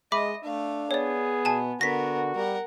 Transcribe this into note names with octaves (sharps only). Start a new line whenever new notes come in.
G#3 D#5 E5 B5 D6
A3 D4 F5
B3 G#4 C#5 D5
B2 G#5 A5 E7
D3 B3 F#4 A#4 A#6 B6
G3 A#4 F#5